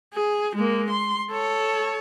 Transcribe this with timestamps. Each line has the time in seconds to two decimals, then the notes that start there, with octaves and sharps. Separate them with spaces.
0.14 G#4
0.55 G#3 A#3
0.90 C6
1.30 A4 C#5